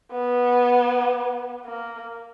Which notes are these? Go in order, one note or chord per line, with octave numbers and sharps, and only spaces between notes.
B3
A#3